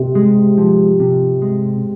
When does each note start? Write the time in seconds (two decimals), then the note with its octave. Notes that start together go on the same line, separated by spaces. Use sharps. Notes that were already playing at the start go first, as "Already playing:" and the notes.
Already playing: C3
0.15 G#3
0.58 F3
1.00 C3
1.42 G#3